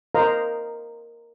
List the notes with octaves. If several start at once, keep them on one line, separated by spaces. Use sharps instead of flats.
A#4 C5 D#5 F5 A#5